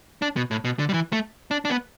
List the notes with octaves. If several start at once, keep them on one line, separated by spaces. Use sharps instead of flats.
D4
B2
A2
B2
D3
G3
E3
A3
D4
D4
B3